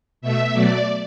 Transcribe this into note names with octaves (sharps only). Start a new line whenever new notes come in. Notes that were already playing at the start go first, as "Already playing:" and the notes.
B2 A3 E5
B2 F#3 A3 D5